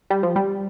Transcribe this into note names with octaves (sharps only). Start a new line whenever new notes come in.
G3
F3
G3